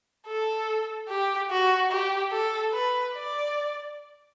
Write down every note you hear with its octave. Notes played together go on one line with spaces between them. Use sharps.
A4
G4
F#4
G4
A4
B4
D5